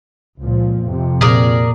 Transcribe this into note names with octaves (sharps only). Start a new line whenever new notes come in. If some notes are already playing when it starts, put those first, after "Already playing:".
C#2 A#2 F3
F2 C3
A#2 G#4 A#4 D5